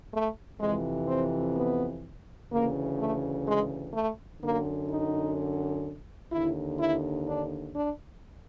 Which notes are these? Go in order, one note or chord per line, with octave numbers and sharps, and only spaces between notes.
A3
F2 C3 E3 G#3
C4
B3
D2 C#3 E3 A#3
A3
G#3
A3
F#2 D3 A#3
D#4
D#2 D3 E4
E4
D4
D4